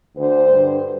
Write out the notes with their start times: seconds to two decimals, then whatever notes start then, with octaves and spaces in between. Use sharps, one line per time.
0.15 D2 D3 C5
0.50 G2 D3